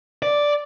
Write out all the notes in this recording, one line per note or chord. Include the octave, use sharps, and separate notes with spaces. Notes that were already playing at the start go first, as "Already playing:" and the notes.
D5